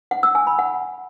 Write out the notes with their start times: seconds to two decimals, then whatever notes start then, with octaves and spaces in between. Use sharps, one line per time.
0.11 F#5
0.23 E6
0.35 G#5
0.47 B5
0.59 F#5